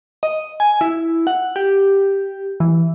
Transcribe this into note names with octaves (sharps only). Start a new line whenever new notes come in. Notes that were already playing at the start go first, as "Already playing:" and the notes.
D#5
G#5
E4
F#5
G4
E3